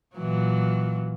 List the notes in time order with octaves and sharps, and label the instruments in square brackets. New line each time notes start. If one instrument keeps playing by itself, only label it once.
[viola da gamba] A#2 E3 F#3